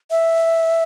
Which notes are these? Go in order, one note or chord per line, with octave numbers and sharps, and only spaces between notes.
E5